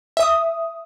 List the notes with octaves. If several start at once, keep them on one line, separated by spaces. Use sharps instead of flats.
E5 D#6